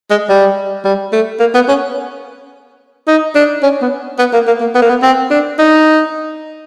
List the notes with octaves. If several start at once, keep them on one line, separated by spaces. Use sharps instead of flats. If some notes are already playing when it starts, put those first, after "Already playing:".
G#3
G3
G3
A3
A#3
B3
C#4
D#4
D4
C#4
B3
B3
A#3
A#3
A#3
B3
A#3
B3
C4
D4
D#4